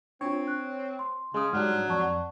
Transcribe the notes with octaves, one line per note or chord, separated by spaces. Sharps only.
C4 D4 F4 C#5
F#6
C6
C#3 G#3 C6 D#6
G#2 F#3 G3 D4 F6
F2 D5 A5 C#6